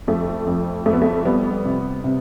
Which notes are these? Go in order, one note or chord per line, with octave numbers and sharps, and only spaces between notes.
F2 A3
F2
F2 A3
B3
A3
G3 B3
C3
C3